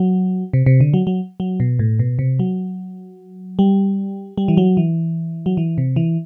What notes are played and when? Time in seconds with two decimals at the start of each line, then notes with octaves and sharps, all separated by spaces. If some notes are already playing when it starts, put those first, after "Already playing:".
Already playing: F#3
0.53 C3
0.66 C3
0.80 D3
0.94 F#3
1.07 F#3
1.40 F#3
1.60 B2
1.79 A2
1.99 B2
2.19 C3
2.39 F#3
3.59 G3
4.38 G3
4.48 E3
4.57 F#3
4.77 E3
5.46 F#3
5.57 E3
5.78 C3
5.96 E3